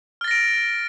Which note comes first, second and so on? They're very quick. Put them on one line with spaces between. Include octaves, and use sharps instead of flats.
F6 A6 A#6 D7